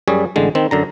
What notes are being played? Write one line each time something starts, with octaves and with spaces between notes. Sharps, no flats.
F#2 G3 G#4 C#5
A1 D3 G#3
D#3 C4
F#2 D3 A#5